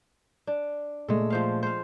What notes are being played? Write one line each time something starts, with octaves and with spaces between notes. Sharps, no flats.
D4
A#2 G#3 A3 A4
F3 C5 F5
C5 F5